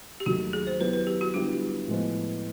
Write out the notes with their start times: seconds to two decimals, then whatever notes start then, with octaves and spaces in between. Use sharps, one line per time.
0.20 G4
0.26 D#2 D#3 F#3 A3 F#4
0.53 G#4
0.67 C5
0.80 F#3 B3 E4 G4 B4
0.93 B4
1.07 G4
1.21 F#4
1.34 D3 G3 B3 E4 F4 G4
1.88 A2 F3 G#3 B3